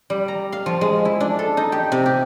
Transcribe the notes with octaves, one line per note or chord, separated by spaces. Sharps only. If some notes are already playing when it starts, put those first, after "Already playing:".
G3
A#5
F5
F3
G#3
E4
D4
A4
D#4
G4
C3
G4